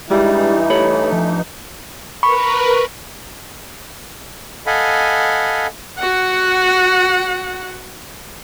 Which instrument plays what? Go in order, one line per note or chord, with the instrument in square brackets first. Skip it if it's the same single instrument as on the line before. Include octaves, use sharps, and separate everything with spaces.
[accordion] G2 E3 D#4 [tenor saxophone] G3 [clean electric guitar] G#3 [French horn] E4
[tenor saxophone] A3 [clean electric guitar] G4 C#5 B5
[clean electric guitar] F3
[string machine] A#4 B4 [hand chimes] B5 [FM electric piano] C#6
[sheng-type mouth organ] A4 D#5 F5 F#5 G#5 B5
[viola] F#4 F#5